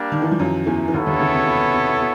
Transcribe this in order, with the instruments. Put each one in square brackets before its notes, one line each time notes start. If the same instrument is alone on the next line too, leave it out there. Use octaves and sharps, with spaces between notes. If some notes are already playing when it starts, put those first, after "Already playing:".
Already playing: [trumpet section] G3 A#3 D4
[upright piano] D#3
E3
F3
F#2 F#3
E2 E3
E3
[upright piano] D#2 D#3 [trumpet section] B3 E4 A4 C#5
[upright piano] D#2 D#3
D3
C#2 C#3
C3
B2
C3
C3
B2